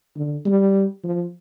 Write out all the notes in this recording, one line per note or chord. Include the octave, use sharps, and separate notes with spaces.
D3
G3
F3